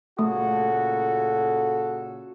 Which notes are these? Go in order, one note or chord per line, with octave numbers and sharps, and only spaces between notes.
A#2 C#3 A3 F#4 A4 D#6